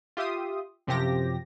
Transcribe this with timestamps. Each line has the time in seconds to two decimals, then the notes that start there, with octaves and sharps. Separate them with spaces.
0.17 F4 G4 E5 C6 D#6
0.87 F#2 C3 F3 G4 A#6